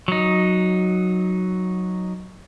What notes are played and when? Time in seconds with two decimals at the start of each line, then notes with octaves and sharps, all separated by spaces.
0.08 F#3 D#4